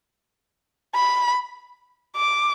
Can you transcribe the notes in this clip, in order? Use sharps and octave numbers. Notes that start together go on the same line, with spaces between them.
B5
D6